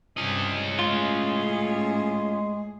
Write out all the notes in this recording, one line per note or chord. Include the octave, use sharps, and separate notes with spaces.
G2 C3 C#4 D#5
A2 G#3 F4 G#4